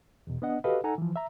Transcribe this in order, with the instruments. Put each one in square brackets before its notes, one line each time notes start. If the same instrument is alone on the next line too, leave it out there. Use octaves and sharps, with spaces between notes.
[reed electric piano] E2 B2
B3 D4 D#5 F#5
F#4 G4 A4 B4 D#5 F5
D#4 A4 F#5 G#5 A#5
E3 F3
E5 A#5